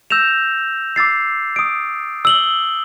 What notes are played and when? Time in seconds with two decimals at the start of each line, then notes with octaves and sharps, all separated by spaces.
0.10 E6 G6 A#6 E7 F7
0.96 D6 E6 A6 C7
1.56 D#6 D7
2.25 E6 F#7 G7